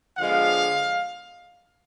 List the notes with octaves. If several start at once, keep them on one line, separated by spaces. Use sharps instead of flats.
D3 F3 G#3 B3 F5